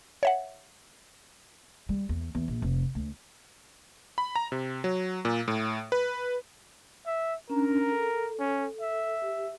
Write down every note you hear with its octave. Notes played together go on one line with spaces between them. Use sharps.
C#5 E5 F#5
G3
E2
E2
A#1
F1
D2
B5
A#5
C3
F#3
A#2
A2
B4
E5
C#4 D4 A#4 A#5
A4
C#4
E5
G4